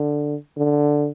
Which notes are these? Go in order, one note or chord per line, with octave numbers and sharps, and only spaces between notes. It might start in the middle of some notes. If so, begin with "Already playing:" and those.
Already playing: D3
D3